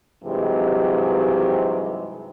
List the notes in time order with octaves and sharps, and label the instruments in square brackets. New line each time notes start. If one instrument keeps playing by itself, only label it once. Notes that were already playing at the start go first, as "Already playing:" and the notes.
[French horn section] G2 C3 D#3 E3 F#3 G#3